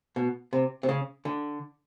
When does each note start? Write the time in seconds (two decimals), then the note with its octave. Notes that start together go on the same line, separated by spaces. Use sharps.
0.16 B2
0.53 C3
0.83 C3
0.89 C#3
1.25 D3